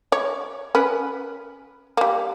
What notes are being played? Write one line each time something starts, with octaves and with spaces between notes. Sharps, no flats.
C#5
C#4 A#4 B4
G3 A#3